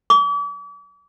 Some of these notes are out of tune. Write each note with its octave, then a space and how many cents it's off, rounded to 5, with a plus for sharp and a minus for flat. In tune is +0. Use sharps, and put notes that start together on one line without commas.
D6 -40